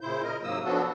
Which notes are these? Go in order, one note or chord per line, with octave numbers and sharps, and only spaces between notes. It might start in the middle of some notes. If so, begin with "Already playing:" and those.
A#2 C#3 E4 C5 G6
A#4 D#5
G#2 C3 F#3 A#3 D#6 E6
F3 F#3 B3 D4 F#4 A4